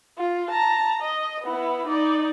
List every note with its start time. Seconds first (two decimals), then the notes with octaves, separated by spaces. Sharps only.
0.17 F4
0.50 A5 A#5
1.01 D#5
1.43 B3 E4
1.87 D#4 D5